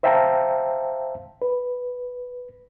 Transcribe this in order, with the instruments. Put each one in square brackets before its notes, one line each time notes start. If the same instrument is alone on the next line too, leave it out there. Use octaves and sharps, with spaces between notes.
[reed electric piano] C5 E5 F5 G5 A5 A#5
B4